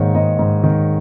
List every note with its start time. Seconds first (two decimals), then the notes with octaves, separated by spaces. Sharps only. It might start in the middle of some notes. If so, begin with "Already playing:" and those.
Already playing: G#2 D#3 A#3 C#5
0.14 G#2 D#5
0.39 G#2
0.64 D#3